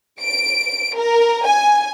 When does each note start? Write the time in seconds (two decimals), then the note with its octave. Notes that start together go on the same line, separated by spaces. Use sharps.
0.22 D7
0.97 A#4
1.46 G#5